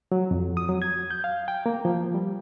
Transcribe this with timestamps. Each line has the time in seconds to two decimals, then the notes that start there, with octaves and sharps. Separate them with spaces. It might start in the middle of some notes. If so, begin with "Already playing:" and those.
0.12 F#3
0.31 F2
0.57 D#6
0.69 F#3
0.82 G#6
1.11 G6
1.24 F5
1.48 G5
1.66 A#3
1.85 F3
2.15 G3